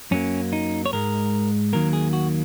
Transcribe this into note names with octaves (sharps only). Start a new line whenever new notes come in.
F#2 F#3 A#3 C#4
D#4
C#5
G#2 G#3 A#4
D#2 D#3 F#3 A#3 A#4
G#4
F#4